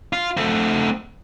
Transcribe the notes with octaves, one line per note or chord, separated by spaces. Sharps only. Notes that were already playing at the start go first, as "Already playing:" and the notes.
F4
A3 C4